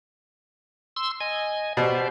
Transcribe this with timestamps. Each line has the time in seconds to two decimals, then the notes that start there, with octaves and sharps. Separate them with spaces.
0.96 C6 E6
1.21 D#5 G#5
1.77 B2 G4 C5 D5